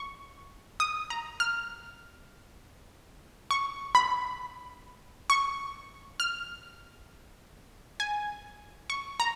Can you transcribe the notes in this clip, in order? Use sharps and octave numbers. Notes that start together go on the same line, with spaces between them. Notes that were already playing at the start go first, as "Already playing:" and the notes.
Already playing: C#6
D#6
A#5
F6
C#6
B5
C#6
F6
G#5
C#6
A#5